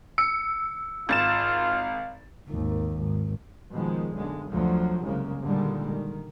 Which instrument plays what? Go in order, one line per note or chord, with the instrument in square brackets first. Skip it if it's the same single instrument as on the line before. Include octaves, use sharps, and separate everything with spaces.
[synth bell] E6 [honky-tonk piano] C#7
[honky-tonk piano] G#1 A6 E7 [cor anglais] F4 [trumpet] F5
[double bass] G#1 D#2
G#1
[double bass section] B2 D#3 F3 G#3
B1 F#2 D3 G#3
D2 F3 F#3
C2 F#2 C#3 G#3 A#3
A#2 D3 D#3 G3 G#3
D#3